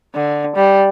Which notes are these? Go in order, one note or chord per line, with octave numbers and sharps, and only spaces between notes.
D3
G3